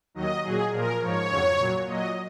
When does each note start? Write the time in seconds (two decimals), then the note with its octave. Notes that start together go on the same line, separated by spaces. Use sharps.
0.14 D#2 D#3 F#3 D#5
0.43 A#2 F#3 G#4
0.72 A#2 F3 A#4
1.00 G#2 F3 C#5
1.29 F2 C#3 F#3
1.58 A#2 F#3
1.86 A#2 F#3 D#5